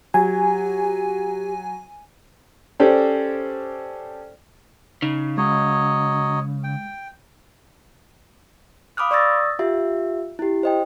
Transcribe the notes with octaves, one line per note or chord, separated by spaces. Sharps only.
F#3 G4 G#5
C#4 G4 A4 C5 D5
C#3 D#4
F#3 G#3 C#5 D#5
G5
F5 B5 D6 D#6 F6 F#6
D5 C#6 D#6 E6 A6 A#6
F4 G4 E5
E4 G4
C5 D#5 G5